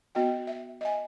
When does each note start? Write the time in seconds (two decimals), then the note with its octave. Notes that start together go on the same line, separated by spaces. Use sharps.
0.15 B3 F#4 D#5 G5
0.47 E5
0.81 D#5 E5 G#5